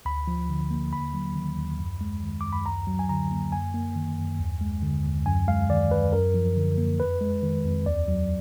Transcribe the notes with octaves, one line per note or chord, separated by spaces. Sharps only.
D2 B5
F3
D3
A#3
D#2 B5
F#3
D#3
D#2
F#2
G#3
D#3
F#2 D6
B5
D2 A#5
F#3
G#5
D3 A#5
A#3
F#2 G#5
A#3
D#3
F#2
D#2
G#3
D3
D#2
F#2 G#5
G#3 F5
D#3 D5
F#2 B4
F#2 A#4
F3
D3
A#3
F2 B4
G#3
D#3
F2
D#2 D5
F#3